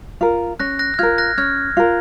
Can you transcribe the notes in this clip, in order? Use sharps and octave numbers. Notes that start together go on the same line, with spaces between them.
F4 A#4
C#4 F#6 A#6
F#6 A#6
F#6
F4 A#4 F6 G#6
F#6 A#6
C#4 F6 G#6
F4 A#4